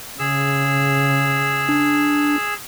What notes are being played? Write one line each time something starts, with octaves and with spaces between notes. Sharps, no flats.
C#3 G#4 E6
D4